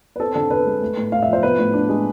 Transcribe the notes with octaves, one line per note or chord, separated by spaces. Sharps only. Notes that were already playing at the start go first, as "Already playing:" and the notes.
B4
C4 A4
D3 A4
D3 B4
G#3
A3
A2
A2 F5
E5
F3
C5
B3 B4
A2
D4
G#3